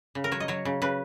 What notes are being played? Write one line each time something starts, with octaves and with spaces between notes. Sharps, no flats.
C#3
A#4
F#3 C#5
D#5
F#3 C#5
C#3
C#3 B4